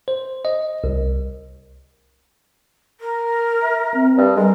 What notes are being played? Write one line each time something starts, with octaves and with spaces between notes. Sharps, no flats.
C5
D#5
C2
A#4
E5
C4
G2
G3 G#3 A#4